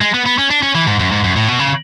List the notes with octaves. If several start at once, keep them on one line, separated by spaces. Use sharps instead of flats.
G#3
B3
B3
C#4
D4
C#4
E3
G#2
F#2
G#2
F#2
A2
B2
C#3